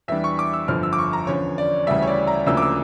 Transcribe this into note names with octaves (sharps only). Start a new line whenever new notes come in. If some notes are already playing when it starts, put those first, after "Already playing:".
E2 E3 G3 D4 E5
C#6
D6
E6
G1 F2 D3 F3 F6
E6
D6
C#6
A#5
E2 D3 F3 C#4 C#5
D5
D2 C#3 E3 G3 E5
C#5
D5
A#5
D2 C#3 F3 A#3 D4 E6
D6
E6